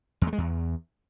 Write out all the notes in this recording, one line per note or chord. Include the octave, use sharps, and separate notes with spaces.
E2
A3
G#3
E2